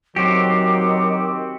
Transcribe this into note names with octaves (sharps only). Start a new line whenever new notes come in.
D#3 F#3 C4 F#4 G4 D6